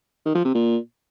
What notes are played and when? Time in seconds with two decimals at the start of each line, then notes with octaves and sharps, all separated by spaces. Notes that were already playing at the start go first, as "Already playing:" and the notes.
0.25 D#3
0.35 F3
0.45 C3
0.55 A#2